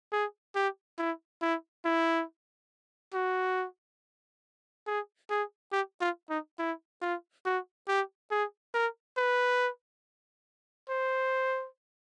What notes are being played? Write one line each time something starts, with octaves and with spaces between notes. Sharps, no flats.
G#4
G4
E4
E4
E4
F#4
G#4
G#4
G4
F4
D#4
E4
F4
F#4
G4
G#4
A#4
B4
C5